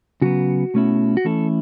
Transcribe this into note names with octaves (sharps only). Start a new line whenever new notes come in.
C#3 F#3 B3 F#4
B2 A3 C#4 E4
F#4
E3 A3 C#4 E4 A4